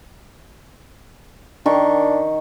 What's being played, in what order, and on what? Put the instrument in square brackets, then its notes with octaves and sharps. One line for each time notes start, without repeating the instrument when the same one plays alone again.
[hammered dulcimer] D#3 C#6 [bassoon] D4